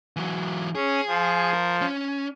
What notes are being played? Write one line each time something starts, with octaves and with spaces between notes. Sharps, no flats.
E3 F#3
C#4 G#4
F3
A#4
C#4